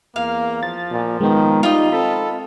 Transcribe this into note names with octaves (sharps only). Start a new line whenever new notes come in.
E2 A#3 F5
F3 A6
A#2
D#3 G#3 B3
G3 D#4 F4 D#5
C4 A4 B5